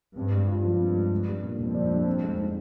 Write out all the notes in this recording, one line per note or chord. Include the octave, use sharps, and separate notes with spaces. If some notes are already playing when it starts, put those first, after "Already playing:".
G2 C4
G#3
F4
G2 F3
C4
G#3
D4
G3
A#2
F2 A#2
D4
G3
C4
G#3
D#4